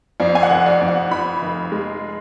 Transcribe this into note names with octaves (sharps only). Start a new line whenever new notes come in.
F2 D5
G#5
F#5
F1
D5
F2
F#5
F2 B5
F1
G#3